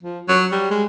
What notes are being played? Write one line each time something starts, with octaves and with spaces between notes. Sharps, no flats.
F3
F#3
G3
G#3